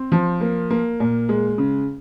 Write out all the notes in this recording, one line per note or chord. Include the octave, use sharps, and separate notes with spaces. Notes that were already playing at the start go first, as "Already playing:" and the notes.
Already playing: C4
F3
A#3
A#3
A#2
G#3
C#3